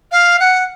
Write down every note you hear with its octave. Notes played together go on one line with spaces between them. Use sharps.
F5
F#5